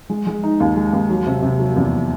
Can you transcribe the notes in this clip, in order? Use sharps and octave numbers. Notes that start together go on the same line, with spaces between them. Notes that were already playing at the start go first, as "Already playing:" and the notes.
G#3
G#3
D#4
D#2
G#3
D#2
F#3
C3
C3
F#3
E2